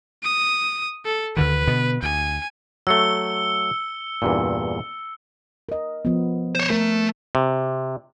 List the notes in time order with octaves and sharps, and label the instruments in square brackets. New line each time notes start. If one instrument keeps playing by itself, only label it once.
[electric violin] D#6
A4
[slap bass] D2 D3 D#3 [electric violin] B4
[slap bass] B2 D3 B3
[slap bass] D2 [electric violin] G#5
[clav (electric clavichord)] F#3 A3 [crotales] E6 C#7 G7
[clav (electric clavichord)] E2 G2 A#2
[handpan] A#4 D#5
F3 B3
[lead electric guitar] C5 C#5
[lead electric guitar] A3 [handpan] A#4
[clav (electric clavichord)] C3